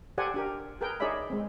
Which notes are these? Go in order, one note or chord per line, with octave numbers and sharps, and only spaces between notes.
G4 A4 C5 D5 F#5 G#5
D4 G4 A#4
G#4 A#4 B4 G5
D#4 G#4 C#5 D5 E5 B5
G#3 C4